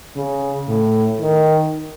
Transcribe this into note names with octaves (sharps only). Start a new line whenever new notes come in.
C#3
A2
D#3